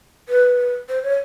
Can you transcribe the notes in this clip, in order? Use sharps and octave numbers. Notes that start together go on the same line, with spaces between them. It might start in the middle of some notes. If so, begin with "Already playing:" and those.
B4
C5
C#5